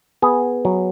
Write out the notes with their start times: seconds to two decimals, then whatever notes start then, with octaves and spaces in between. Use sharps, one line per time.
0.22 B3 G#4
0.65 F#3